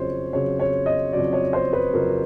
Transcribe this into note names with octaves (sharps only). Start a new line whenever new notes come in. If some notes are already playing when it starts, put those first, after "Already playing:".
Already playing: F2 C#3 F#3 C5 C#5
F2 C#3 F#3 C#5
C#5
D#5
F2 C#3 F#3 D5
C#5
C5
B4
F2 C#3 F#3 A#4